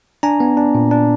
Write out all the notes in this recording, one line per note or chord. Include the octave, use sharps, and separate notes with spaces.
D4 G#5 A#5
B3
D4
A#2
D4